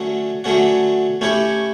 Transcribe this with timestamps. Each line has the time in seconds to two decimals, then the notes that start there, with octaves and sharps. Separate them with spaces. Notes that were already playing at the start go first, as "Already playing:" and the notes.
Already playing: D3 F#3 A3 C#4 F#4
0.44 D3 F#3 A3 C#4 F#4
1.21 A3 C#4 E4 G4 C#5